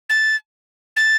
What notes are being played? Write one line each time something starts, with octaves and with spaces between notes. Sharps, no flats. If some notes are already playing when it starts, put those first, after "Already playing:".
A6
A6